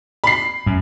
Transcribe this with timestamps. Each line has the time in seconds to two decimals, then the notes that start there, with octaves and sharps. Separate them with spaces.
0.24 B5 C7
0.66 F#2